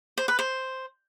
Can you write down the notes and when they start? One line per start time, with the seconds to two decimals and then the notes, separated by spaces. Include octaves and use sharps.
0.18 C5
0.28 B4
0.39 C5